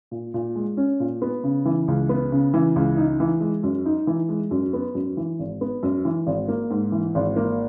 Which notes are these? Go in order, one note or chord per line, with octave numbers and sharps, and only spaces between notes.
A#2
A#2
G#3
C#4
A#2
B3
C#3
E3
C#2
B3
C#3
E3
C#2
D#4
E3
G#3
F#2
D#4
E3
G#3
F#2
B3
F#2
E3
G#1
B3
F#2
E3
G#1
A#3
G#2
E3
G#1
A#3